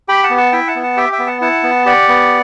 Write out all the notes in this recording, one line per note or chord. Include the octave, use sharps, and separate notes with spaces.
G4 G5 B5
F#5 A5
B3
F#5 A5
E4 E5 G5
F#5 A5
B3
F#5 A5
G4 E5 G5
E5 G5
B3
F#5 A5
E4 F#5 A5
B3
G4 D5 F#5
B3